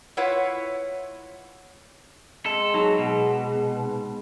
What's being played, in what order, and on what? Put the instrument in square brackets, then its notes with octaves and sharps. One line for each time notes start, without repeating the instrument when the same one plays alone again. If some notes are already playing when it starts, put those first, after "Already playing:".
[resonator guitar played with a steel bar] E4 F4 B4 C#5 F#5
[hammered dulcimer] G#3 C4 [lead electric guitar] A4
[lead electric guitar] F#3 [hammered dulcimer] B3 [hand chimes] D#4 G#4 A5
[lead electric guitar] B2